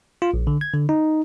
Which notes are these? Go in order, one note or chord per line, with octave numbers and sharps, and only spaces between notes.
F4
A#1
D3
G#6
D3
D#4